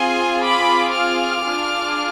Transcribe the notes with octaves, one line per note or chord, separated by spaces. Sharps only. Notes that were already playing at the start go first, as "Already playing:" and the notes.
Already playing: C4 F4 G#4 G#5 C6
B5 D6
D6 F6
D4 F4 G#4